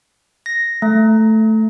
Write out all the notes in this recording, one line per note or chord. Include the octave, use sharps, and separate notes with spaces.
A#6
A3